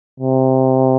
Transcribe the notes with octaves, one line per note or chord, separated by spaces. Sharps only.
C3